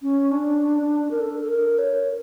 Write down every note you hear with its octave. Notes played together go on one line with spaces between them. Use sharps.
C#4
D4
A#4
A4
A4
A#4
C#5